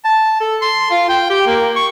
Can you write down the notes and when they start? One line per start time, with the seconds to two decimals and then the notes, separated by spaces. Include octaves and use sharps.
0.05 A5
0.40 A4
0.62 C6
0.91 F4
1.09 G5
1.30 G4
1.47 A#3
1.76 C#6